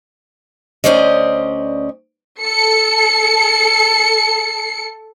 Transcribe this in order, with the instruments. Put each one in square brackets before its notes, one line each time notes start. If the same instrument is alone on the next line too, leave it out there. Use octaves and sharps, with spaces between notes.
[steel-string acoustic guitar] D2 B2 C#4 C5 D5 D#5
[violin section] A4 C#7